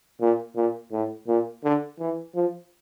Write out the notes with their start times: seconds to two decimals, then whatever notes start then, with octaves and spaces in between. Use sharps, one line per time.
0.21 A#2
0.56 A#2
0.92 A2
1.28 A#2
1.64 D3
1.99 E3
2.35 F3